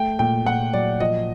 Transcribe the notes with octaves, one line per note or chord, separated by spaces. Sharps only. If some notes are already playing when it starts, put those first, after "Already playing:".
Already playing: A3 G5
A#2 G5
A#2 F#5
F#3 D5
F3 D#5